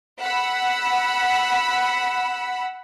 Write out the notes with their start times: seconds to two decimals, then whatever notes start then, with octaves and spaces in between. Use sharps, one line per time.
0.21 F#5 B5 E6